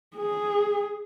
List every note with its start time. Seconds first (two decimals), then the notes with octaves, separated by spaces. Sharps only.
0.17 G#4